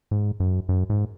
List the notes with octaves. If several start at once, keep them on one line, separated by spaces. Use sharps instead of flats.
G#2
F#2
F#2
G#2